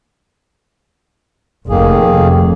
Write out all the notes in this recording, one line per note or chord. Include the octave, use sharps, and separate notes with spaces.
F1 D#3 A#3 G#4